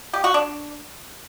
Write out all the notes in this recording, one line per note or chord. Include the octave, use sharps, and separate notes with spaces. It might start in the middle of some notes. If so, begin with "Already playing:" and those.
G4
F#4
D4